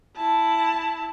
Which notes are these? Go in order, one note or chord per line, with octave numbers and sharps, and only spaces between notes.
E4 A5